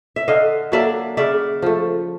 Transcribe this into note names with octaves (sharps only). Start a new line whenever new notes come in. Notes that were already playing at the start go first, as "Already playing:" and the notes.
E5
D3 D#5 F5
F#3 A#3 D4 D5 E5
C#3 D5 E5
F3 A3